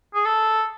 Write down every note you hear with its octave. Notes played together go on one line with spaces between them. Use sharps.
G#4
A4